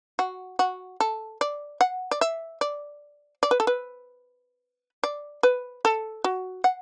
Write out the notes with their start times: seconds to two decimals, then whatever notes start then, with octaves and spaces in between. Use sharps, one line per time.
0.19 F#4
0.59 F#4
1.00 A4
1.41 D5
1.81 F#5
2.11 D5
2.21 E5
2.61 D5
3.43 D5
3.51 B4
3.60 A4
3.67 B4
5.03 D5
5.43 B4
5.85 A4
6.24 F#4
6.64 F#5